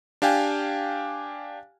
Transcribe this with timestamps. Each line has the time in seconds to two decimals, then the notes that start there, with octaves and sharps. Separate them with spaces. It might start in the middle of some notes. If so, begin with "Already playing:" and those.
0.22 D4 G4 F5 G5 G#5